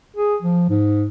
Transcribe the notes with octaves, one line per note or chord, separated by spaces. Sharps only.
G#4
F3
G#2